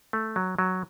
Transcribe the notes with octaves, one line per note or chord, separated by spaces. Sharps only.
A3
F#3
F#3